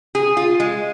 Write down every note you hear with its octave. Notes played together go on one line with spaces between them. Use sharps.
G#4
F4
G#3